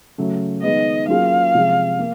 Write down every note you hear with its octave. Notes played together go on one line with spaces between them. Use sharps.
C#3 F#3 A3
D#3 G#3 B3 D#5
F#3 A#3 C#4 F4 G#4 F5
C3 F3 G#3
A#3